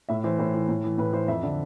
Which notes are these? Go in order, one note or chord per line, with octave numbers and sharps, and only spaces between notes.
A2 E5
E3 C5
A2 C5
E3
A2
E3
A2 B4
E3 C5
F2 E5
D3